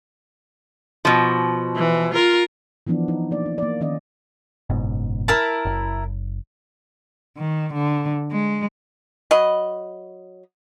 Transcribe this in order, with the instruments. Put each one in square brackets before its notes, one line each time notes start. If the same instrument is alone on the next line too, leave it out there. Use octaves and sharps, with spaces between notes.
[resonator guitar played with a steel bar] B2 F3
[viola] E3
F4 A#4
[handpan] E3 F3 B3 D4 E4
D#4
A#3 D5
D#4
A#3 D5
D#3 C#4 D5 D#5
[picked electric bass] F#1 G#2 B2
[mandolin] E4 A#4 A5
[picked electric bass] F#1
[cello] D#3
D3
G#3
[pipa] F#3 D#5 B5